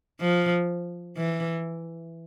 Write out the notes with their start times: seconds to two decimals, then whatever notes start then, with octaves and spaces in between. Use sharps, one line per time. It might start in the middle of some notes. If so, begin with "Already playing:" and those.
0.20 F3
1.17 E3